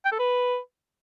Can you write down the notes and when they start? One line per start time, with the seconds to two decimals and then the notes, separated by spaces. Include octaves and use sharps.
0.05 G5
0.12 A4
0.19 B4